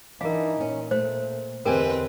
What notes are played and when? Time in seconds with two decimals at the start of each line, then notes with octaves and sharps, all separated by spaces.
0.21 E3 D4 D#4 A#4 F5
0.60 A#2 C#4
0.91 A3 C5
1.65 E2 D3 C4 G4 A#4 B4 D#5 G#5